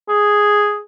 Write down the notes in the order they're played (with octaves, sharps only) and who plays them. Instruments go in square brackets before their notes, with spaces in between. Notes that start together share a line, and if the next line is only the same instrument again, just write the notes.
[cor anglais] G#4